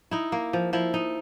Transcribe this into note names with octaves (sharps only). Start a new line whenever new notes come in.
D#4 E4
A#3
F3
F3 E4
D#4